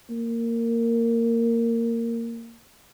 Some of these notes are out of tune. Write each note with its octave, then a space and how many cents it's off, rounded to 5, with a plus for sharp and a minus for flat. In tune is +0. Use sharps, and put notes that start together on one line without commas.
A#3 -15